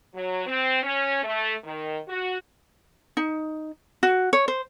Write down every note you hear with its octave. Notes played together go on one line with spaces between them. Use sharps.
F#3
C4
C#4
A3
D#3
F#4
D#4
F#4
C#5
C5